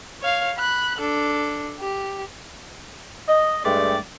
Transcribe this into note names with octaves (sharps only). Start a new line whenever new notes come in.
C#5 F5
B5 F#6
D4 A4
G4
D#5
G2 G#3 A3 D5 G5